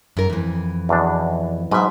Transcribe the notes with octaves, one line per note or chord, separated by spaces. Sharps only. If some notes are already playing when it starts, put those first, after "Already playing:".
F#2 A#4
F2 E3
E2 B2 D4
G#2 B2 F#3 E5